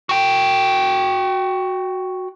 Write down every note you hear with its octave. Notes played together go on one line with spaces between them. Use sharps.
F#4 G5